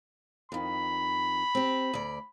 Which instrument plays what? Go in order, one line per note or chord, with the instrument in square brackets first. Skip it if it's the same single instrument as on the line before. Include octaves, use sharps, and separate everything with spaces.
[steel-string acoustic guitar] F2 D#3 [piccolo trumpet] B5
[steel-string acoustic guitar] C4 G4
D2 D5